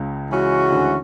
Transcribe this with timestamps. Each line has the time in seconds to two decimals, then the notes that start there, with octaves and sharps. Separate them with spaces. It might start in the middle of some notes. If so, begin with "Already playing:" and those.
Already playing: C#2 C#3
0.31 E3 G#3 C#4 F#4
0.72 D2 D3